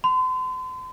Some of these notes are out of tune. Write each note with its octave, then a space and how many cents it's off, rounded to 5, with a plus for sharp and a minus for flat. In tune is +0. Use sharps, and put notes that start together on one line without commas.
C6 -40